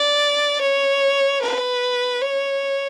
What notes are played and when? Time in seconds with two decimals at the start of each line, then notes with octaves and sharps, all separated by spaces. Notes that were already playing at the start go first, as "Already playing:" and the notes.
Already playing: D5
0.61 C#5
1.42 B4
2.21 C#5